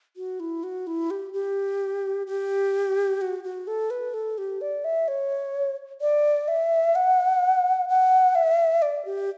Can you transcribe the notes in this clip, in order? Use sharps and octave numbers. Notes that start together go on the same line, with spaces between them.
F#4
E4
F#4
E4
G4
G4
G4
F#4
F#4
A4
B4
A4
G4
D5
E5
C#5
D5
E5
F#5
F#5
E5
D5
G4